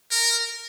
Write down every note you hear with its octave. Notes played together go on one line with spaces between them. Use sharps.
A#4